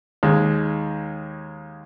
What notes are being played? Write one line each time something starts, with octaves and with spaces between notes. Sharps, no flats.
D#2 G#3